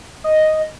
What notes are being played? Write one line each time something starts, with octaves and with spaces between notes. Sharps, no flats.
D#5